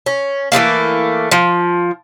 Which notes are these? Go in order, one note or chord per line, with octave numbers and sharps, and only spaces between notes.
C#4
E3 F#3 A3 A#3
F3